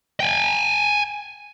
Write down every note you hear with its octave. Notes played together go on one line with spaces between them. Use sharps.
G5 G#5